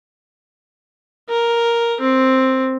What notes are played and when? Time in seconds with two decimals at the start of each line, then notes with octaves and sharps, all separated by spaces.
1.29 A#4
2.01 C4